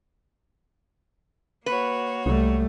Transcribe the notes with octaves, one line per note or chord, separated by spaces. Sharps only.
A#3 F#4 B4 C#5
C2 G3 A3